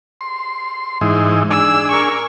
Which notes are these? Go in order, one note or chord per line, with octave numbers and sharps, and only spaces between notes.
C6
G#2 E3 D#4
D4 G#4 E6
A#4 C#6